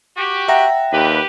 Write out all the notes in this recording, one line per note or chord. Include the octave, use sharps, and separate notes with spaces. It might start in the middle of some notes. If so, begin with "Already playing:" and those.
F#4 G4
E5 F#5 G5 A#5 A#6
D#2 G4 B4